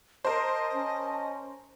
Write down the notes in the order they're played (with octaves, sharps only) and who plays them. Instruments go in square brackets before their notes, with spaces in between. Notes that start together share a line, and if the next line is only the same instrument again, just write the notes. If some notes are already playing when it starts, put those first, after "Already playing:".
[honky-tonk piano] A#4 C5 [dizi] D#5 [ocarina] A5
[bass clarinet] C#4